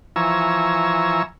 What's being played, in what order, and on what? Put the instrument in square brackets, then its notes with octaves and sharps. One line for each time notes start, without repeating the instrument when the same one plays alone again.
[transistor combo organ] E3 F3 G#5 A#5 C#6 E6